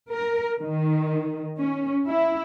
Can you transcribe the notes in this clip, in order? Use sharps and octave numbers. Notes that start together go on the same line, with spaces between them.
A#4
D#3
C#4
E4